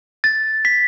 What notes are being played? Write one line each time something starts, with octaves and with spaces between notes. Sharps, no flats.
A6
B6